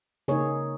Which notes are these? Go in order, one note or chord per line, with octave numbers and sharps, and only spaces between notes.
C#3 A#3 D#4 G#4 C#5